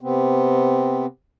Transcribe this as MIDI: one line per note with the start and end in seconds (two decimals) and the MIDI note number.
0.01 1.06 48
0.01 1.06 59
0.01 1.06 60